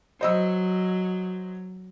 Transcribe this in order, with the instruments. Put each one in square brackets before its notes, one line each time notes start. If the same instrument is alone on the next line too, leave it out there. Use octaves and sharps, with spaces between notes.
[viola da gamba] F#3 [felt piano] C5 D#5 E6